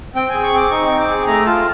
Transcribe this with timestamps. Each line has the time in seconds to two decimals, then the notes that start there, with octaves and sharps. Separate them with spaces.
0.15 C4 G5
0.29 G#4 G#5
0.43 C#6
0.53 C4 D6
0.71 D#4 C#6
0.89 C4
0.99 D6
1.09 G#4
1.27 A3 A#5
1.46 F4 A5